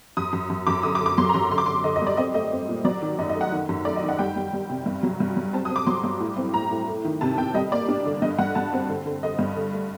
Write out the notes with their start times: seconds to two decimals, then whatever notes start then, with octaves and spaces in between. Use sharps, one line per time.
0.17 F#2 D#6
0.33 F#2
0.50 F#2
0.67 F#2 D6
0.83 D3 D#6
0.95 D6
1.00 D3
1.06 D6
1.18 F#3 C6
1.29 A#5
1.34 F#2 C6
1.51 D3 C6
1.58 D6
1.66 D3 C6
1.84 D3 D#5
1.96 D#5
2.02 G3
2.07 D5
2.17 C4 D#5
2.34 A3 D#5
2.52 C4
2.69 A#2
2.85 F#3 D5
3.02 D#3
3.19 F#2 D#5
3.29 D#5
3.35 A3
3.41 F#5
3.52 D#3
3.69 F#2
3.85 A3 D5
3.96 D#5
4.03 D#3
4.09 F#5
4.19 G3 G5
4.36 G3
4.53 G3
4.70 C3
4.86 G2
5.03 F#3
5.20 G2
5.36 F#3
5.53 C4 A5
5.65 D#6
5.70 C4
5.76 D6
5.86 F#3 C6
6.04 G2
6.20 A2
6.37 C4
6.54 A2 A#5
6.71 A2
6.88 A3
7.05 D#3
7.21 C3 A5
7.38 C3 G5
7.54 G3 D#5
7.72 A#3 D5
7.88 D4
8.06 D3
8.22 G2 D#5
8.39 G2 F#5
8.55 G2 A5
8.73 C4
8.89 D3
9.06 D3
9.23 D3 D#5
9.39 G2
9.56 D3
9.73 A3